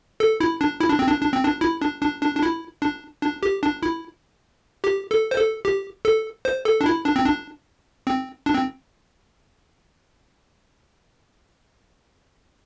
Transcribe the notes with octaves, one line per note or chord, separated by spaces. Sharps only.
A4
E4
D4
E4
D4
C4
D4
D4
C4
D4
E4
D4
D4
D4
D4
E4
D4
D4
G4
D4
E4
G4
A4
C5
A4
G4
A4
C5
A4
D4
E4
D4
C4
D4
C4
D4
C4